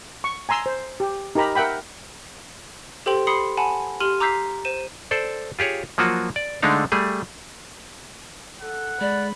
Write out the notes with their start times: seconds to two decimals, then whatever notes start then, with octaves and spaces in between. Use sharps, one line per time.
0.24 C#6
0.49 G#5 A#5 C6 E6
0.66 C5
1.00 G4
1.35 D#4 G4 A#4 A#5 B5
1.55 A#4 E5 F#5 G5 B5
3.06 G4 A4 C5 G5 C6 F#7
3.27 B5 C6 D#6 C7 C#7
3.57 F#5 G#5 A5 B5
4.00 G4 C6 F6 D#7 F#7
4.20 A#5 D6 E6 G6 B6 C7
4.65 C5 D#7 E7
5.11 A4 C5 D5
5.59 F4 G4 G#4 C#5
5.98 F3 F#3 A#3 F4 F#4
6.36 D5
6.62 D3 G#3 A3 D4 D#4 F5
6.92 G3 A3 G#4
8.61 A4 F#5
9.01 G#3 D5 B5